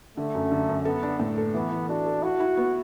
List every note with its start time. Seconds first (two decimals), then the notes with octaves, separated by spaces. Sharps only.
0.17 D3 A3
0.35 F#2
0.51 D3
0.69 F#2
0.85 B3 A4
1.03 D4
1.20 A2
1.38 A4
1.54 E3 B3
1.71 E3
1.89 D4 F#4
2.06 A4
2.23 E4 F#4
2.40 E4
2.57 B3